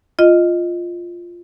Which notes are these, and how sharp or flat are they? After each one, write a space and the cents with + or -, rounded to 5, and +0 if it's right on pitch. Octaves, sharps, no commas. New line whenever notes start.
F4 +0 D#5 +0